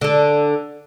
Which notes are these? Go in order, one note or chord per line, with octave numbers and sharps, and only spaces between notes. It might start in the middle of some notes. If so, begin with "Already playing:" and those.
D3 A4